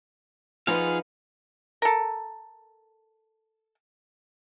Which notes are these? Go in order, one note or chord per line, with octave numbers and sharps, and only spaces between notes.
F3 D#4 F4 G#4 B4 F5 F#5
A4 A#4